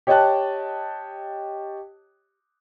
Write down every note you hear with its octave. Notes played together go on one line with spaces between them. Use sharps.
G4 C#5 D#5 G5 A5 F#6